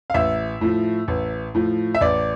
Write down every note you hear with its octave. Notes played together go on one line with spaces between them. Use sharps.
F5
A1 E5
A2 F3
A1
A2 F3
E5
A1 D5